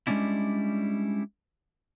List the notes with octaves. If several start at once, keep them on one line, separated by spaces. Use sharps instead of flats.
G3 G#3 A#3 C#4 D4 E4